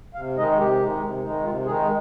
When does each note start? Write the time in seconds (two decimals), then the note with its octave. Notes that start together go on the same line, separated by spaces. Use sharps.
0.14 C3 F5
0.36 D#3 G#3 D#4 D#5
0.58 C3 G4
0.80 D#3 G#3 D#4
1.01 C3
1.23 D#3 G#3 D#4
1.44 C3 F4
1.65 D#3 G#3 D#4 G#4